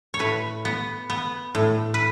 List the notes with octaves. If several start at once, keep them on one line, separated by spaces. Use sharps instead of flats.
C#5
A2 B4
B3
B3
A2
B4